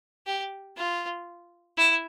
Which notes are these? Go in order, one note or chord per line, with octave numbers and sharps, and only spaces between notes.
G4
F4
E4